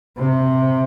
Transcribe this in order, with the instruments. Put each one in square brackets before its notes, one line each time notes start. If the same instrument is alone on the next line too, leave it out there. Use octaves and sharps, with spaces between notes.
[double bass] C3